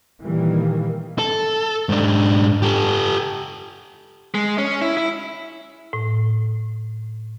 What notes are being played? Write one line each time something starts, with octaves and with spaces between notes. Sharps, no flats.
A#2 D#3 E3 G3 A#3
A4
G#2 D4
G4 A4
G#3
C#4
E4
E4
A2